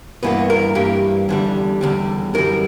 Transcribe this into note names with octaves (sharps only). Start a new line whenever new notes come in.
G2 E3 A#3 B3
A#4
G2 E3 A#3 G4
E2 D3 G3
E2 D3 G3
F#2 E3 G3 A#4